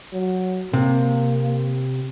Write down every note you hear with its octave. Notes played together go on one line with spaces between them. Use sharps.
F#3
C3 A#3